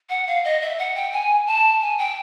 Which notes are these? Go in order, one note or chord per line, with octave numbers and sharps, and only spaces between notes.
F#5
F5
D#5
E5
F#5
G5
G#5
A5
G#5
G5